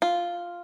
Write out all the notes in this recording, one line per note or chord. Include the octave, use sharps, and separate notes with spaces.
F4